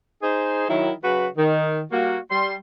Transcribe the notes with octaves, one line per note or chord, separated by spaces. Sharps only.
D#4 G#4 C5
D#3 F#3 E4
C#3 F#3 F#4 B4
D#3
G3 A#3 F#4
G3 C6